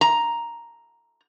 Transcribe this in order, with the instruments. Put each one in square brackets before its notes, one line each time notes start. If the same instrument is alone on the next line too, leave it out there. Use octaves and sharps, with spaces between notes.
[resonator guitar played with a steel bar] A#5